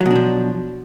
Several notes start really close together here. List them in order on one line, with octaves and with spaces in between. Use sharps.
F#3 B2 D4 F3